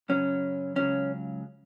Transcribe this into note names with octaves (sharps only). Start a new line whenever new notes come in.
F#2 C#3 F#3 C#4
C#2 C#3 F#3 C#4